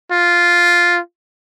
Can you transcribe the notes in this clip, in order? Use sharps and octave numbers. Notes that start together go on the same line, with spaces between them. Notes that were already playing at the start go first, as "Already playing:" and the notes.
F4